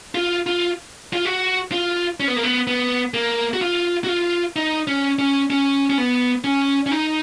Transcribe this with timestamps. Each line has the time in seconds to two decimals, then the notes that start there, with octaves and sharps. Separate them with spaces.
0.15 F4
0.46 F4
1.13 F4
1.25 F#4
1.72 F4
2.20 C#4
2.28 B3
2.36 A#3
2.43 B3
2.67 B3
3.14 A#3
3.53 F#4
3.61 F4
4.04 F#4
4.09 F4
4.56 D#4
4.87 C#4
5.19 C#4
5.50 C#4
5.90 C#4
5.98 B3
6.44 C#4
6.86 C#4
6.91 D#4